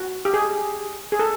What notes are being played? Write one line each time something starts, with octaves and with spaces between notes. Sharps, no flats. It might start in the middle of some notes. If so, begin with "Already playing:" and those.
Already playing: F#4
G4
G#4
G#4
A4